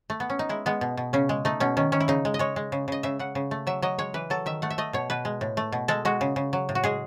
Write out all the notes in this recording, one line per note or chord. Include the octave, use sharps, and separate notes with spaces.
A3
B3
C#4
D#4
G#3 E4
G#3 B3
B2
B2
C#3 C#4
G#3
A3 D#4
B2 C#4
D#3 C#4
D#3 C#4
E4
C#3 D#4
G#3
D#5
G#3 C#5
G#3
C#3
C#3 D#5
C#3 E5
C#3 F#5
C#3
A3
F#3 E5
F#3 D#5
G#3 C#5
E3 B4
F#3 A4
D#3 E5
A3 F#5
E5
A3 D#5
B2 C#5
B2 B4
G#3
A2
A3
B2
G#3 A4
G#3 F#4
C#3
C#3
F#3
A2
F#4
G#3 G#4